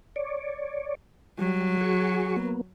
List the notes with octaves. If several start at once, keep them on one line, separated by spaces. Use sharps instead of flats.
C#5 D5
F#3 G3
F#4 G#4 C#6
A#3 B3